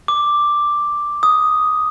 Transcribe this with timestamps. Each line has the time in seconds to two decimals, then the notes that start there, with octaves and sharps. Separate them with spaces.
0.08 D6
1.23 D#6